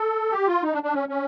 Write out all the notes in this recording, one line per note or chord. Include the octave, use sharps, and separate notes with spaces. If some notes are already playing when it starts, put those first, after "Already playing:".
Already playing: A4
G4
F4
D#4
D4
D4
C#4
C#4